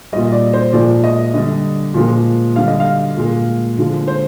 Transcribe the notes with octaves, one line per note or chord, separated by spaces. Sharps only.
A#2 G3 D#5
D5
C5
A#2 F3 G#3 D5
D#5
D3 G3 D#5
A#2 F3 G#3
D3 G3 F5
D#5
F5
A#2 G#3
D3 F3 G#3
C5